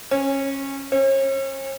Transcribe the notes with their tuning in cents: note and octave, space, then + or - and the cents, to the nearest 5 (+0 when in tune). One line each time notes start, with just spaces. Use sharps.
C#4 -20
C#4 -40